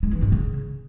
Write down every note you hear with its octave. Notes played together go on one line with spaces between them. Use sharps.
G#3
E3
G#2
C#3